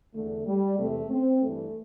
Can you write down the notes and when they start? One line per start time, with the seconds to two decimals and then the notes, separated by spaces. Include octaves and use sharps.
0.15 E2 D3 A3
0.47 G3
0.78 E2 C3 E3 A3
1.10 C4
1.41 G2 E3 A3